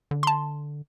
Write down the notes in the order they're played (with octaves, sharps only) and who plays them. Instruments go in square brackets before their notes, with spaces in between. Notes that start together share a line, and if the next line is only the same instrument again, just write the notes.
[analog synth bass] D3
[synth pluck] A5 C6